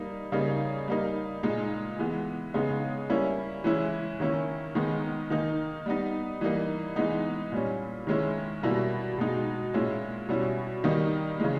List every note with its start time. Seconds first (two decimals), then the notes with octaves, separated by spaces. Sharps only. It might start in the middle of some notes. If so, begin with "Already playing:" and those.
Already playing: G3 A#3 D#4
0.32 C#3 G3 A#3 D#4
0.88 G3 A#3 D#4
1.43 A#2 G#3 D#4
1.99 E3 G#3 B3
2.54 C#3 G#3 B3 D#4
3.10 G3 A#3 C#4 E4
3.64 E3 G#3 C#4 E4
4.20 D#3 A#3 C#4 E4
4.75 D#3 G#3 B3 D#4
5.30 D#3 A#3 D#4
5.86 G3 B3 D#4
6.41 E3 G3 A#3 D#4
6.96 E3 G#3 B3 D#4
7.52 A#2 G3 C#4
8.07 D#3 G#3 C#4 E4
8.63 B2 G3 A#3 E4
9.18 B2 G#3 D#4
9.74 A#2 G#3 C#4 E4
10.29 B2 G3 C#4 E4
10.84 D#3 G3 A#3 D#4
11.40 C#3 E3 G#3